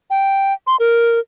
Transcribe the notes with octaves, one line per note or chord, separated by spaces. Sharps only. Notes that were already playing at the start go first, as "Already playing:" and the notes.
G5
C6
A#4